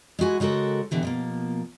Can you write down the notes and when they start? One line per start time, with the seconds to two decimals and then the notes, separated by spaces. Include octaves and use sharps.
0.19 G#3 E4 F#4 G#5
0.40 C#3 G#3 F#4 A4 A#4
0.91 B2 D3 E3 G4
1.03 B2 F3 A#3